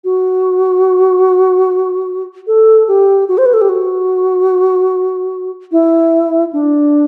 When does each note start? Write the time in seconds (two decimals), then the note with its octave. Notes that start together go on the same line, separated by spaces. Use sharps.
0.04 F#4
2.47 A4
2.88 G4
3.28 F#4
3.38 C5
3.46 B4
3.53 A4
3.61 G4
3.69 F#4
5.72 E4
6.53 D4